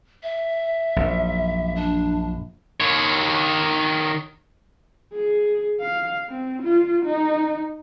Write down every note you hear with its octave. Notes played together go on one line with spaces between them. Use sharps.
E5
A#1 F#2
D4
D#3 C#5
G#4
F5
C4
F4
D#4